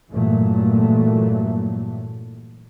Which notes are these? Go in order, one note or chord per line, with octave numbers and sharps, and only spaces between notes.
G2 A#2 E3 F#3 A3